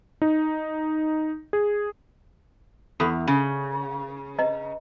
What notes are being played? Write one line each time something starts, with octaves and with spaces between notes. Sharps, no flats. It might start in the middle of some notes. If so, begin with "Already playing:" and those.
D#4
G#4
E2 A4 B5 D#6
C#3
B4 D#5 A#5